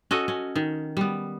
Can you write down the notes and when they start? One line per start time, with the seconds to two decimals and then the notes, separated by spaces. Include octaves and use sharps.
0.11 C#4 F#4 A4 D#5
0.28 C#4
0.56 D#3
0.97 G3 B3